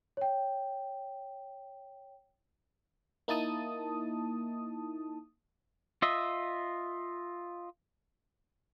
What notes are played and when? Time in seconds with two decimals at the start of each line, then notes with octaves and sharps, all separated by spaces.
0.17 C#5 G5
3.28 A#3 D#4 E4 A5 D#6
6.02 F4 D#5 E5